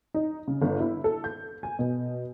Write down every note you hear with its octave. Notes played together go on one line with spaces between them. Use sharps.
D#4
C#3
G1
E4
A4
G6
G#5
B2